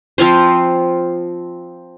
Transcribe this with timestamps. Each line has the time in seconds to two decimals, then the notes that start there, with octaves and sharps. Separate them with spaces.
0.18 F3 C4 F4 C5